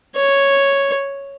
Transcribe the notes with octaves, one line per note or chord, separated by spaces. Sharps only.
C#5